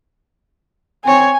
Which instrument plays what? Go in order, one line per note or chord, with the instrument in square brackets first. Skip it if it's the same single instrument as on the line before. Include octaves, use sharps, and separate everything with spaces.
[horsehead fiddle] C4 C#5 [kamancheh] G#5